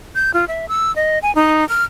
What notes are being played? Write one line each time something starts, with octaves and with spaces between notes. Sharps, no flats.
G6
F4
E5
E6
D#5
G#5
D#4
F6